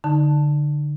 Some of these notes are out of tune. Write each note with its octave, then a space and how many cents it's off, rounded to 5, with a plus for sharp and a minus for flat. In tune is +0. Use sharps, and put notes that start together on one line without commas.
D3 +0 D#4 +0 A5 +0